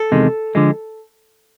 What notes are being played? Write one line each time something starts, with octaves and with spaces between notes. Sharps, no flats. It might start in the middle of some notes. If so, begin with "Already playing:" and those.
Already playing: A4
E2 C3 D#3 G#3
D3 F3 G#3